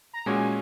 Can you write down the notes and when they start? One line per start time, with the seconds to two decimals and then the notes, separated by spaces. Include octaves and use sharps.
0.13 A#5
0.26 A#2 G#3 C#4 F#4 G#5